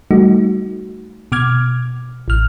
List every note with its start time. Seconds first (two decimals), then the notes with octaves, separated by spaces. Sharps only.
0.11 G3 A3 D#4 F#4
1.32 B2 D6 F6 G#6
2.28 A1 F6